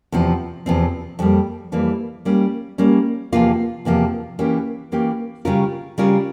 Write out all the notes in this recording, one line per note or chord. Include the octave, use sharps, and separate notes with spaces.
E2 C3 F3 C4
E2 C3 F3 C4
F2 E3 G3 A#3
F2 E3 G3 A#3
G3 A#3 C#4
G3 A#3 C#4
E2 C3 F3 A#3 F4
E2 C3 F3 A#3 F4
E3 A#3 C#4 G4
E3 A#3 C#4 G4
C#3 G3 C#4 F4 A#4
C#3 G3 C#4 F4 A#4